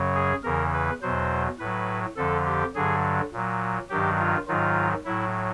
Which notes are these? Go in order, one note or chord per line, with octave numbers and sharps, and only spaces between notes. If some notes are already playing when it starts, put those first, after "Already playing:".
Already playing: F#2 C#3 F#3
G#4
E2 C#3 E3 A#4
B4
E2 B2 F#3 C5
A2 F#3 B4
F2 D3 F3 A4
G4
G2 D3 F#3 G#4
A#2 F#3
G2 D#3 F#3 G4
F4
G#2 D#3 F#3 F4
A2 F#3 E4